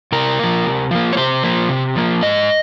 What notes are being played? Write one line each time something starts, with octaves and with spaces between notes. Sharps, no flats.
C3 A#4
F3 A#3
C3
F3 A#3
C#5
C3 C5
F3 A#3
C3
F3 A#3
G#2 D#5